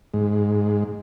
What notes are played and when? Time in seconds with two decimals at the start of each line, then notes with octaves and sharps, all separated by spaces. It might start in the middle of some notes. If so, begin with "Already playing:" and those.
0.14 G#2